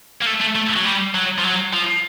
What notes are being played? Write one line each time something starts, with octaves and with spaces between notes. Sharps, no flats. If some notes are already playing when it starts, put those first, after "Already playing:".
A#3
A3
A3
A3
F#3
G3
F#3
F3
F#3
F3